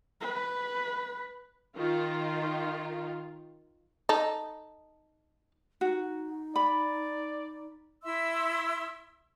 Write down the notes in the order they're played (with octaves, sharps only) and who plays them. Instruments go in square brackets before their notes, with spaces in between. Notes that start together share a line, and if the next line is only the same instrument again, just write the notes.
[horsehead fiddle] B4
[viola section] D#3 F4
[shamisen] D#4 A4
[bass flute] D#4 [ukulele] F#4
[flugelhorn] D5 [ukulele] B5
[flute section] E4 E5 C6 E6